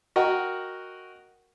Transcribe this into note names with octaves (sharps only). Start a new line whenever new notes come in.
F#4 A#4 D#5 F#5 G5